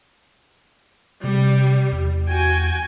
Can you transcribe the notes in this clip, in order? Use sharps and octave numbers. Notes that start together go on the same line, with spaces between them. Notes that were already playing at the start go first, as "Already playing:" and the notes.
C3 G3
E2
F#4 G5 G#5